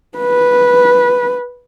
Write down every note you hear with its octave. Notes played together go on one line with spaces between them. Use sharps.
B4